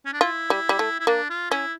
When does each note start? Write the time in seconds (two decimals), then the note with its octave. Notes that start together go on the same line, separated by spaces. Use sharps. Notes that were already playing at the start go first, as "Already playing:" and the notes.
0.05 C#4
0.13 D4
0.21 E4 F4
0.50 G3
0.69 G3
0.79 A3
1.00 E4
1.07 A#3 D4
1.30 F4
1.50 C#4 E4